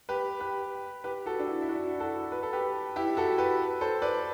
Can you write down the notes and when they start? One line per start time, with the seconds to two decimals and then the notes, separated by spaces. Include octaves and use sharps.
0.09 G4 B4
0.40 G4 B4
1.04 G4 B4
1.26 F#4 A4
1.39 D4
1.47 E4
1.62 E4
1.69 D4 F#4
2.00 F#4 A4
2.32 B4
2.43 A4
2.53 G4 B4
2.96 E4 G4
3.17 F#4 A4
3.38 G4 B4
3.81 A4 C5
4.02 B4 D5